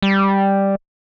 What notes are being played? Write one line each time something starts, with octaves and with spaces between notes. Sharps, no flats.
G3